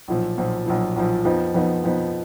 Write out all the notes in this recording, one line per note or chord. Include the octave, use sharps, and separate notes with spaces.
B1 A#2 F3
B1 A#2 F3
B1 A#2 F3
B1 A#2 F3
F2 F3 B3 D#4
F2 F3 B3 D#4
F2 F3 B3 D#4